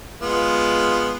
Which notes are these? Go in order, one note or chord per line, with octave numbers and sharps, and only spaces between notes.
G#3 B3 F4